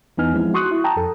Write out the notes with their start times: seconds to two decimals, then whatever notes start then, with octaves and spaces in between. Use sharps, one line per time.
0.17 E2 E3 B3 D#4 G#5 F6
0.33 F3 G#3 C4 E4
0.54 F#4 C6 C#6 D#6 F#6
0.71 E4
0.84 G5 A5 A#5 D#6
0.96 F2 A4